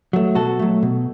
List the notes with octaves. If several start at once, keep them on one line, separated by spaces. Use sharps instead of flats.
F#3 A3
B2 F#4 A4
F#3 A3
B2